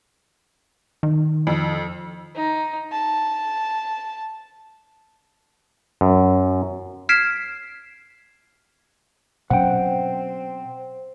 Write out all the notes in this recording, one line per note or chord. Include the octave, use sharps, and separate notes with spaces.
D#3
F2
D#4
A5
F#2
F6 G#6 B6 C7 D7 E7
B2 F#3 C4 C#4 F#5 G5